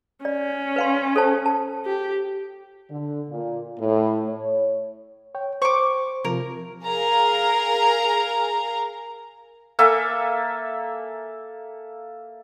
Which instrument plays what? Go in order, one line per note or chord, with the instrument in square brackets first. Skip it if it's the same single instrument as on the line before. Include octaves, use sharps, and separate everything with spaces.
[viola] C#4 [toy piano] D5
[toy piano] B4 F5 C6
A4 C5 A5
A5
[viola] G4
[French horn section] D3
A#2
A2
C#5
[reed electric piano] C#5 G5
[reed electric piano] C5 [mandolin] C#6 D6
[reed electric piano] C3 F3 [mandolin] A#4
[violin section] G#4 A#4 F5 A#5
[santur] A#3 A4 E5 G#5